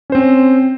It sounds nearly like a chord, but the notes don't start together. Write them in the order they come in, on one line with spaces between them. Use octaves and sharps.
C#4 C5 C4